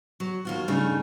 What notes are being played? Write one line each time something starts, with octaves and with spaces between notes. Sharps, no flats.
F#3
D#2 F4 F#4
G2 C#3 A3 D#4